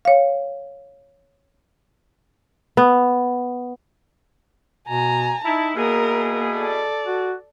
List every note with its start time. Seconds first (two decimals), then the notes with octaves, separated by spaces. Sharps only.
0.05 C#5 F5
2.77 B3
4.88 B2 G#5 A#5
5.44 D#4 E4 A5
5.76 B2 A#3 E4 G#4 A#4
6.55 A4 D5
7.07 F#4